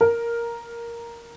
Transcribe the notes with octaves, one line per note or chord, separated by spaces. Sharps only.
A#4